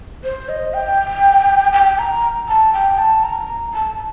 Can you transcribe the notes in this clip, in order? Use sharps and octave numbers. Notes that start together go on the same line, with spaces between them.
C5
D#5
G5
G5
A#5
A5
G5
A5
A#5
A5